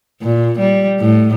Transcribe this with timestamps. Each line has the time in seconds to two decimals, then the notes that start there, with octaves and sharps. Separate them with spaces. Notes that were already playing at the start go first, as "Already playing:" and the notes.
0.21 A#2
0.59 G3
1.00 A2